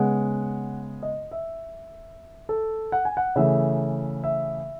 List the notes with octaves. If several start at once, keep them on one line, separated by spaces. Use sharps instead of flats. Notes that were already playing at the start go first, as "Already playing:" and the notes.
Already playing: C#3 G#3 B3 F#5
D#5
E5
A4
F#5
G#5
F#5
C#3 E3 A3 E5
E5